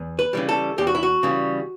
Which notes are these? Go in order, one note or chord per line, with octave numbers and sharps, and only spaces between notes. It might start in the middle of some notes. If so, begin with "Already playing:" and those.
Already playing: E2
B4
C#3 E3 G3
A4
E2 G4
F#4
E4
F#4
C#3 E3 G3